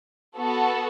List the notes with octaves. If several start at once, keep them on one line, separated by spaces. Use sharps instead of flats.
B3 F#4 A4